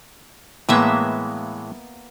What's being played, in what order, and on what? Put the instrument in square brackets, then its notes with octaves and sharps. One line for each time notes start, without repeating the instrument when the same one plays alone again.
[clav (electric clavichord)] A2 E3 G#3 [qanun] A#3 B3 E5